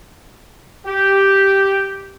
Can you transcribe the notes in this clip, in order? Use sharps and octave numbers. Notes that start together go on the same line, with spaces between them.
G4